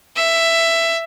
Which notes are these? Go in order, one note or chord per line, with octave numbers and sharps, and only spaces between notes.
E5